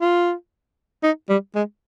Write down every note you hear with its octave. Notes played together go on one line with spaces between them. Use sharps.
F4
D#4
G3
G#3